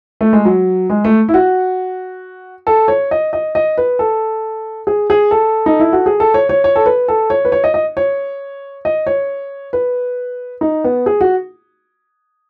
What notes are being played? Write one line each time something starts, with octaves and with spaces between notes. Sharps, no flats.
A3
G#3
F#3
G#3
A3
E4
F#4
A4
C#5
D#5
D#5
D#5
B4
A4
G#4
G#4
A4
D#4
E4
F#4
G#4
A4
C#5
C#5
C#5
A4
B4
A4
C#5
B4
C#5
D#5
D#5
C#5
D#5
C#5
B4
D#4
B3
G#4
F#4